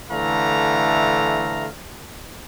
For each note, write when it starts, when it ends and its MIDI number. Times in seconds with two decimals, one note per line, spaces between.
0.11 1.68 50
0.11 1.68 52
0.11 1.68 57
0.11 1.68 77
0.11 1.68 82